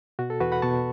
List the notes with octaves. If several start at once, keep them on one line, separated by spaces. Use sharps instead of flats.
B2 F#4
A4
E2 F#4 B4
F#5 B5
B2 A5 C#6